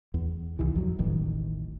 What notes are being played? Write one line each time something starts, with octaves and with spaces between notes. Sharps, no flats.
E2
C2 D#3 E3
A#1 F2 E3 F#3
E1 A1 D#3 E3